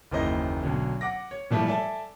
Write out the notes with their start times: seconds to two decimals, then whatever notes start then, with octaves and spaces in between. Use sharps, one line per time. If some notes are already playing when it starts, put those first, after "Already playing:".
0.11 F#1 D#2 E3 C5 D#5
0.63 B1 D3 F#3
1.01 F#5 D6 A#6
1.31 C#5
1.50 A#2 E3 F3 G3 A3
1.67 A4 D5 E5 G#5